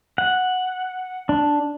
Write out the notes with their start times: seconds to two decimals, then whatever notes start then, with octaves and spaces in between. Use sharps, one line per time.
0.18 F#5
1.29 D4